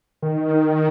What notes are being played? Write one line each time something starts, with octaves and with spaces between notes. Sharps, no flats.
D#3